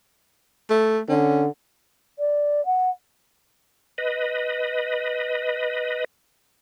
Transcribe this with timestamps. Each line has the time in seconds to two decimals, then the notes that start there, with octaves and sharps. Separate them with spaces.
0.70 A3
1.09 D3 C#4
2.19 D5
2.66 F#5
3.98 B4 D#5